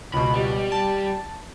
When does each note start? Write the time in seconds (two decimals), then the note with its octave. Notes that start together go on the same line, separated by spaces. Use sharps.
0.13 C#2 B2 B5
0.34 G3
0.72 A5